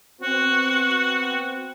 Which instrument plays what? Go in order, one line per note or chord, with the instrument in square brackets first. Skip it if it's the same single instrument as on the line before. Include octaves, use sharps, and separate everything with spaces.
[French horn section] B3 C4 [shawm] F#4